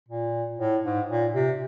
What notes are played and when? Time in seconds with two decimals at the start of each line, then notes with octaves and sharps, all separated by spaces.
0.08 A#2
0.59 A2
0.84 G#2
1.09 A#2
1.34 C3